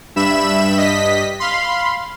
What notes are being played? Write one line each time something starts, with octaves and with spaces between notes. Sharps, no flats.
G2 E5 B5 E7
G2 D#5 B6
F5 B5 C6